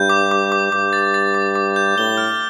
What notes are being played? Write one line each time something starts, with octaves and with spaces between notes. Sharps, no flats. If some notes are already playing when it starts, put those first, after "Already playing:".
Already playing: G2 G6
D6
D6
D6
G2 D6
A6
A6
D6
D6
G6
A2 G7
F6